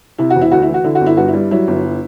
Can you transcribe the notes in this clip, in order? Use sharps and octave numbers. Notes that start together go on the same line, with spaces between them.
C3 E4
F#4
E1
E4
D2 F#4
E4
E3
F#4
D3 E4
F#4
G1
E4
G2 F#4
E4
G3
F#3 E4
G1